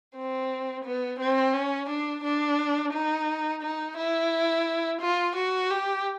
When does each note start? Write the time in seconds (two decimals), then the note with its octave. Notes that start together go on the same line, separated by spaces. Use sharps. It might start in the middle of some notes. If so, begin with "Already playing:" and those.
0.15 C4
0.85 B3
1.19 C4
1.54 C#4
1.89 D4
2.23 D4
2.93 D#4
3.62 D#4
3.97 E4
5.01 F4
5.36 F#4
5.70 G4